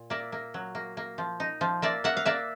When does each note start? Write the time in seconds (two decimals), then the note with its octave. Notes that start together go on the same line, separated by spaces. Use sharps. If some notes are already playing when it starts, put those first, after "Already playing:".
Already playing: A#2
0.10 A#3 D5 E5
0.32 A#3
0.54 F#3
0.75 A#3
0.97 A#3
1.18 F3
1.40 D#4
1.61 F3
1.82 A#3 D5 E5
2.04 A#3 E5 F#5
2.17 F5
2.25 A#3 D5 E5